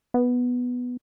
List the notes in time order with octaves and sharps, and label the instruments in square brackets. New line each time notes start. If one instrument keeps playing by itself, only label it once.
[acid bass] B3